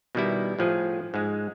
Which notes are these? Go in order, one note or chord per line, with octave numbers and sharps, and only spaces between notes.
B2 D#3 G3 E4
A2 F3 G#4
G#2 G#3